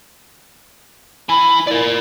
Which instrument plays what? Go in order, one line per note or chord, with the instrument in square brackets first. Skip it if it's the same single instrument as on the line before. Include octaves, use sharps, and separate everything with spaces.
[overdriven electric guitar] E4 G#5 [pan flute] B5
[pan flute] E4 [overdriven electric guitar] A#4 D5